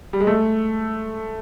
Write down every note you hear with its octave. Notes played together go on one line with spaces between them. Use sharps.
G3
G#3
A3